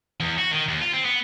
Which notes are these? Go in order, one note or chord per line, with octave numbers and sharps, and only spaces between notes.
E2
F#4
D#3
D#2
F4
C4
B3